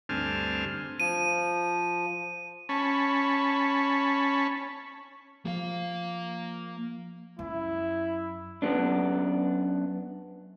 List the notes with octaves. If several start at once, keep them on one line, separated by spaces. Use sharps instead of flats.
D2 G2 C4 G#5 A5 F6
F3 D#7
C#4 A5 B5 C#6
F3 A#3 F5
F#2 E4
F#2 B3 D4